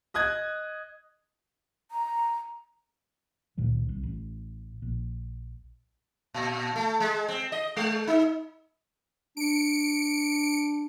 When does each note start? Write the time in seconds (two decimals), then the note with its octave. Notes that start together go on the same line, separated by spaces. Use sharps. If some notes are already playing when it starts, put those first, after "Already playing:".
0.14 D#5 D#6 F#6 G#6
1.91 A#5
3.57 C#2 A#2 D#3 F#3
3.89 C2
4.03 A1
4.82 A#1
6.34 A#2
6.76 A3
7.00 G#3
7.28 C4
7.52 D#5
7.76 G#3
8.07 D#4
9.37 D4 C#7 D7